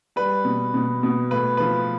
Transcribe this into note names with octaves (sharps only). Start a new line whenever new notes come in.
G3 B4
B2
B2
B2
A2 B4
F3 B4